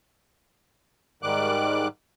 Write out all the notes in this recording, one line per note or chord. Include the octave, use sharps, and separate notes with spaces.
G#2 D#3 G3 D6 F#6